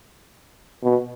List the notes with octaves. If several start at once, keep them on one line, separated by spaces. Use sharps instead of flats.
B2